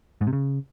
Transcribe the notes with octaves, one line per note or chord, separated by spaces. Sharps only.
G#2
C3
C#3